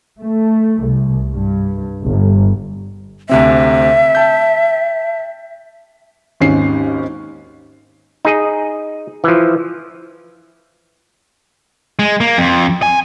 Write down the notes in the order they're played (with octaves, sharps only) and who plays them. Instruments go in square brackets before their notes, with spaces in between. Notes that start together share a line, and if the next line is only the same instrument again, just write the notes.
[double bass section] A3
C2
G2
G1
[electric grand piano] D2 C3 C4 [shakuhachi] E5
[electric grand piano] G5 A5 G6
[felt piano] G#1 D#2 G#2 C#4 C7
[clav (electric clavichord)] D#4 G#4 D#5
E3 F3
[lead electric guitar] G#3
A#3
F2
G#5